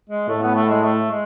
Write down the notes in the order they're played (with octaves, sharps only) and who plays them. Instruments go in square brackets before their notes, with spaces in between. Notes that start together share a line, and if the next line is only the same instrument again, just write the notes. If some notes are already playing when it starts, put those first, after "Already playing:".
[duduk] G#3
[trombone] A2 [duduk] A3
[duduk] B3
A3
G#3
A3
G#3